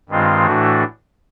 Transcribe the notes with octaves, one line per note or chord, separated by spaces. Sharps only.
G2 D#3 G#3 C4 F4
A2 E3 A3 D4 F#4